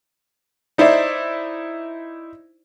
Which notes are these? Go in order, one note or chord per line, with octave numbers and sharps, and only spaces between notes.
D#4 E4 C5 D5 E5